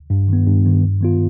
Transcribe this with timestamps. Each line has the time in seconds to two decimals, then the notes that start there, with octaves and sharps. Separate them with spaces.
0.10 G2
0.28 D#3 B3
0.47 G2
0.65 D#3 B3
0.83 G2
1.01 D#3 B3 F4